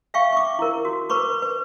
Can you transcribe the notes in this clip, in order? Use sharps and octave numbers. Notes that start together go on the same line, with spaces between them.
E5 F5 G5 C#6
C#6 D6
E4 A#4
F#4
A#4 B4 B5 C#6 D6
B4